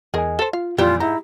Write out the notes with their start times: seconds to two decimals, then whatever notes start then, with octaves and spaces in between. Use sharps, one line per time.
0.14 E2 G#4 A#4 D#5 G#5
0.39 A4 C5
0.53 F4 F5
0.78 F2 A#2 E3 G3 F4 G4
1.00 G#2 E4 A#5